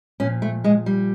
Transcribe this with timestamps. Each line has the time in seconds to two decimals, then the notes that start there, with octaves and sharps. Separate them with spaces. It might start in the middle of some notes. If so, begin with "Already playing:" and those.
0.20 A#2 F3 C#4
0.42 A3
0.64 G#3
0.86 G3